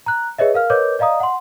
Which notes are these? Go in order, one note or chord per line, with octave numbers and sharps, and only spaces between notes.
A#5 F#6
G#4 B4 C#5 D#5 E5
A#4 F5 F6
A#4 B4 C#5 D#5 D6 G6
D5 D#5 F5 A#5 D#6
F#5 C6